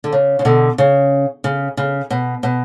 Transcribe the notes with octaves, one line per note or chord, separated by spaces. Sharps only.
D3
C#3
C#3
B2 D3
C#3
C#3
C#3
B2
B2